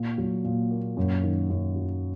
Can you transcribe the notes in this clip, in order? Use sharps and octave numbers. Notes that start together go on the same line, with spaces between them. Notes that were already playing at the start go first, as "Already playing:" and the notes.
Already playing: A#2
F#3
A#2
A#3
F#2
D#3
F#2
F#3